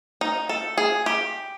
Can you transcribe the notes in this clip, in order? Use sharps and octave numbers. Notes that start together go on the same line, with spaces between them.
D#4
A4
G#4
G4